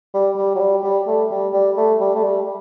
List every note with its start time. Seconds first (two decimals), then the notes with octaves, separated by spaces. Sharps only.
0.14 G3
0.37 G3
0.55 F#3
0.60 G3
0.84 G3
1.07 A3
1.31 G3
1.54 G3
1.77 A3
2.01 G3
2.15 A3
2.23 G3